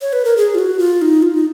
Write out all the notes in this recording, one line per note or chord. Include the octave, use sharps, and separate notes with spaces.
C#5
B4
A#4
G#4
F4
F#4
F4
D#4
F4
D#4